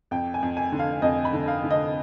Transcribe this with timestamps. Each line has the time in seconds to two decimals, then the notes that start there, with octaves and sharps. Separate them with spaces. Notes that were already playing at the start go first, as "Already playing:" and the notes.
0.11 F2 G5
0.34 G#5
0.43 F2
0.57 G#5
0.72 D3
0.79 F5
1.02 F2 D#5
1.25 B5
1.33 D3
1.48 F5
1.64 D3
1.71 D#5